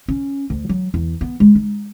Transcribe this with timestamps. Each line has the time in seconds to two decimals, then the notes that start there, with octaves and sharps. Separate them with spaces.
0.08 C#4
0.50 D2
0.69 F#3
0.94 E2
1.21 B3
1.40 G#3
1.55 D#4